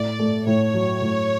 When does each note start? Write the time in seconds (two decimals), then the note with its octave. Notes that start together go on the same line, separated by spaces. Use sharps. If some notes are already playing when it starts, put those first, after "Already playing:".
Already playing: A2 D5
0.19 A3
0.46 A2 C#5
0.74 F#3
1.02 A2